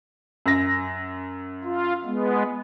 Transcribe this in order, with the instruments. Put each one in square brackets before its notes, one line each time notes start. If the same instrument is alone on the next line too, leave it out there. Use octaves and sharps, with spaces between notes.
[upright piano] F#2 A#6
[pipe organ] F4
G#3 B3